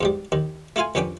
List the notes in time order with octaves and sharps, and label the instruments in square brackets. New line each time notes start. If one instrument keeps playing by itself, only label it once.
[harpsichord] E2 G#2 G3
D#2 D#3
A3 E4 F4 F5 G#5
C2 F2 C#4 D4 B4 G5